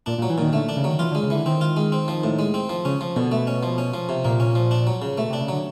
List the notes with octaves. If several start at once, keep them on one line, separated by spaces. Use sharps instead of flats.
A#2 D4
A#2
F#3
E3
A#2 D#3
D3 A3
D4
C#3
D#3 F#3
E3 F4
D3
G#3
C#3
D3 E3
D#3 C4
F4
G#3
C4
F3
A2
G#3
C4
F3
C#3 C#4
F3
B2 D3
A3
C#4
F3
C#4
F3
C3
A#2 A#3
C#4
F3
D4
F#3
C#3
B2 A3
C3
D4
C#3
D3 F#3